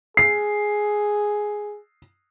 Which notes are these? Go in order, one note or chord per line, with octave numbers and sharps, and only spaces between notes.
G#4 C7